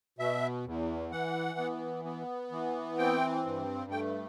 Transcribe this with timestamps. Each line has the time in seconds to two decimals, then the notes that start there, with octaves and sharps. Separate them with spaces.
0.19 B2 E5
0.65 E2
1.11 E3 F#5
1.59 B3
2.05 B3
2.51 E3
2.98 C4 G5
3.45 G2
3.91 A3 G5